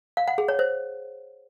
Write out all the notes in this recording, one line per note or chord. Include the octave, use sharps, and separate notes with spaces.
F5
F#5
G#4
C#5
C5